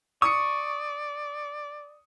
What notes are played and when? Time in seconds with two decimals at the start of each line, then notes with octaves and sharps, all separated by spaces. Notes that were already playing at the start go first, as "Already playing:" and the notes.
0.22 D5 C#6 D#6 C#7